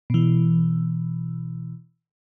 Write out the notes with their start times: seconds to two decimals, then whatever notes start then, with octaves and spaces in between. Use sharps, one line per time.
0.10 B2 E3